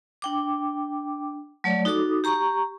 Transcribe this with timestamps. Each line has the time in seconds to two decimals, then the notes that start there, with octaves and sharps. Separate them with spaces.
0.22 D4 G5 D6
1.64 F#3 A3 C#5 D5
1.85 D#4 F#4 A4 D6 D#6
2.24 G4 A#5 C#6